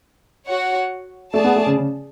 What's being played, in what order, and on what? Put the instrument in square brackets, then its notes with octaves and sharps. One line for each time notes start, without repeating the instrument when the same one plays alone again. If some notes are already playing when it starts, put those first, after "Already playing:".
[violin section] F#4 C#5 F#5
[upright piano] A3 [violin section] G#4 D5 A5
[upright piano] B3
A3
C#3
C#3